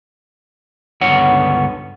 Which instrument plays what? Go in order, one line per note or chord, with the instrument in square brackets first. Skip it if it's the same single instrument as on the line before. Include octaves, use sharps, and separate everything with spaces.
[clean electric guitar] C#2 G2 D3 B3 C#5 F#5